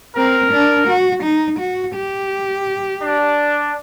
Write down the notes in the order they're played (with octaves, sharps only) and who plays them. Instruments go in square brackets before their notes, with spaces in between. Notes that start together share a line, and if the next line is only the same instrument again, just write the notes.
[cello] C4 [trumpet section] A#4
[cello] D4
F#4
D#4
F#4
G4
[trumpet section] D4